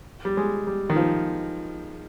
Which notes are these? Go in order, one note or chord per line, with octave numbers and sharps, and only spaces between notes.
G3
G#3
G3
D#3
F3